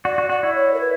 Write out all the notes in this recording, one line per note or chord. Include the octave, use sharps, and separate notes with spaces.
F#4 D5
F#4
F#4 D5
E4 D5
C#5
A#4
B4